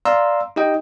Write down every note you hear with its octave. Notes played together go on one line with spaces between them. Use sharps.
D5 F5 A#5 C6 E6
D#4 G4 D#5 G5